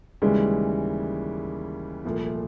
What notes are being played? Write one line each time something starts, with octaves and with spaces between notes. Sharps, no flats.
D#2 C#3 E3 G3 G#3
C2 A#2 F3 A3